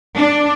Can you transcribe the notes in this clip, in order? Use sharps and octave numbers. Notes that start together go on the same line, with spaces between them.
D4